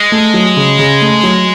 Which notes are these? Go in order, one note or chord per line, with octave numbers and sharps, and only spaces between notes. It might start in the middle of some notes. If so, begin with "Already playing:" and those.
Already playing: G#3
A3
F#3
C#3
C#3
A3
F#3